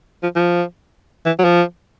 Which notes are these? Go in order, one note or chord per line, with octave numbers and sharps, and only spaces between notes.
F3
F3
E3
F#3
F3